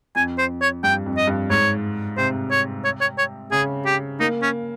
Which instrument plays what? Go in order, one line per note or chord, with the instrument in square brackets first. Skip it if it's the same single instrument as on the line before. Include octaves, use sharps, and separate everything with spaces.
[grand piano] F2 [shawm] G#5
[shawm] C5
C#5
[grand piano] G2 [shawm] G5
[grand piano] F2
[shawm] D#5
[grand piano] G2
[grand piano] G#2 [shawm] C#5
[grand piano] C3 [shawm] C5
[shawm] C#5
C#5
C#5
C#5
[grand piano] C#3 [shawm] G#4
[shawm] G4
[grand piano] A#3 [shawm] D#4
[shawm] C#4